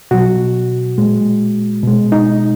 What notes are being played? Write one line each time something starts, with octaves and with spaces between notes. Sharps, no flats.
B2 F#3 F#4
A#2 G#3
B2 G#3
D#4